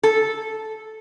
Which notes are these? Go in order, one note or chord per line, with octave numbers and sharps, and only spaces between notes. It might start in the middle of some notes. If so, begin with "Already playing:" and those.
A4